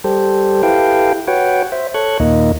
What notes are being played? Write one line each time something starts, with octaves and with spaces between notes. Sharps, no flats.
G3 G4 A4 C5
E4 G4 A4 B4 F5 G5
F#4 B4 C#5 F#5 G5
C5 E5
A4 C#5 C#6 F#6
D#2 A#2 A#3 D#4 D#5